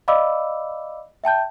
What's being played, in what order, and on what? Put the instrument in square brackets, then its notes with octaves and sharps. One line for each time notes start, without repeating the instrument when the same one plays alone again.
[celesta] D5 D#5 F5 B5 D6 E6
E5 G5 A5 G6